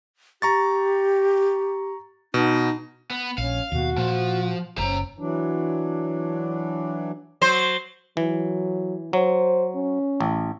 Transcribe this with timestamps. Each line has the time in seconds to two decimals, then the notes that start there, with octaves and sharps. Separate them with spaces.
0.42 G4 A#5 C#6 A6
2.34 B2 D#4
3.10 B3
3.38 A#1 C#4 F5
3.72 D#2 B2 F#4
3.97 A#2 F3
4.78 F#1 C#4 C5 A#5
5.19 E3 F#3 D4
7.41 F#3 C5
8.17 E3 F#3
9.13 F#3 C5
9.75 C#4
10.20 A1